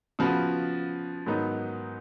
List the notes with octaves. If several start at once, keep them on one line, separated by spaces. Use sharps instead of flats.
C#3 F3 B3 F#4
G#2 D#3 F#3 B3 D#4